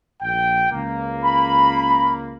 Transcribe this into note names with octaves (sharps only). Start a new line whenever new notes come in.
A#1 G5
C#2 A#3
B5